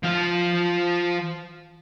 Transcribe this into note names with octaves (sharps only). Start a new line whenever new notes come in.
F3 F5